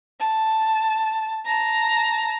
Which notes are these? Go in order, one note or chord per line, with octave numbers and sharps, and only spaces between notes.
A5
A5 A#5